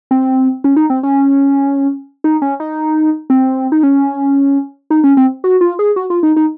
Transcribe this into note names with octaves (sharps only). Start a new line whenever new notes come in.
C4
C#4
D#4
C4
C#4
D#4
C#4
D#4
C4
D#4
C#4
D#4
C#4
C4
F#4
F4
G#4
F#4
F4
D#4
D#4